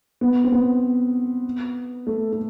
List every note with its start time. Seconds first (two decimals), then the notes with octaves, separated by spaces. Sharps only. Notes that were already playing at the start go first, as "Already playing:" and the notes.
0.21 B3
0.44 C4
0.52 B3
2.07 A3
2.33 A3